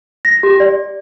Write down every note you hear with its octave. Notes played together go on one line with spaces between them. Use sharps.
A#6
G4
D5